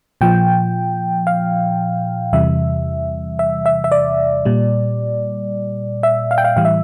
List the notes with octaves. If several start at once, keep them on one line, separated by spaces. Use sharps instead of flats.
A#2 F3 G5
F5
E2 C3 E3 G3 E5
E5
E5
E5
D5
A#2 G3
E5
F5
G5
F5
A2 E3 G3 F5
E5